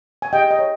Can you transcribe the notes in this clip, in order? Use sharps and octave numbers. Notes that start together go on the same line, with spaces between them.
G#5
G4 D#5 G5
D#5
C#5